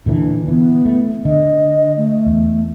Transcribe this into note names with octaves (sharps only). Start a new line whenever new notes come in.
A#2 D3 E3 D4
E3 B3
A3
D3 D#5
A3
E2